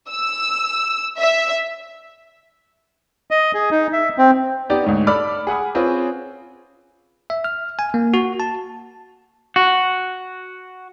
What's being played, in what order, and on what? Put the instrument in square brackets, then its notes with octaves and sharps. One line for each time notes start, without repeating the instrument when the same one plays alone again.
[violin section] E6
E5
[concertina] D#5
G#4
D#4
E5
C4
[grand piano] B3 D#4 G4 D5
D2 G#2 C#4
A4 D5 B5 D6 F6
G#4 F#5 B5 D#6
C4 C#4 F4 G#4 B4 C5
[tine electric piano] E5
F6
G#5
A#3
F#4
A5
[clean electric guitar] F#4